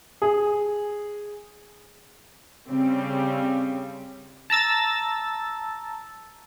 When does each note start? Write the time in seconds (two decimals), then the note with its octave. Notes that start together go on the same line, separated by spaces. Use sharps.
0.22 G#4
2.69 C#3 G3 C4
4.50 A5 A#5 E6 A6